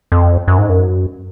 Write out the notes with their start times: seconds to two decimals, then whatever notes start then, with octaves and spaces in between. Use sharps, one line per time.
0.12 F2
0.48 F#2
0.58 G#2
0.69 F#2